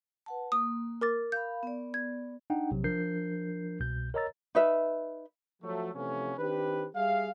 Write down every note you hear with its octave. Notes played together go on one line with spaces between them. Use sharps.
B4 F#5 A5
A#3 D#6
A#4 D6 A6
F5 B5 G6
B3 D5
G#6
D4 D#4 F#5 G5
A#1 C3 F#3
F3 D4 A#4 G6 C7
C2 B2 G6
A#4 C#5 D#5 A#5 E6 A6
D#4 B4 E5
F3 F#3 A3
C3 E3 F3 A3 B3 C#4
D#3 C4 D4 G4 B4
G3 G#4 E5 F5